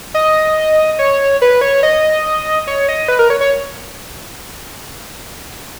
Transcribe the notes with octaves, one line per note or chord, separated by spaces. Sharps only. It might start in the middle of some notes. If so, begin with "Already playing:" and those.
D#5
C#5
B4
C#5
D#5
C#5
D#5
B4
A#4
C#5
C#5